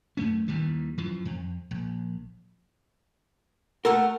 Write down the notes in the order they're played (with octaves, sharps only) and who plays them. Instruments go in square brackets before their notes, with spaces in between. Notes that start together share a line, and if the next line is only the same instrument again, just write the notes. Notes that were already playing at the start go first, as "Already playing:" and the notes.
[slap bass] F#2 A3 C#4
D#2 D#3 E3 G3
F#2 E3 F3
F2
A#1
[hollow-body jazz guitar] A3 A4 A#4 [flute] F#5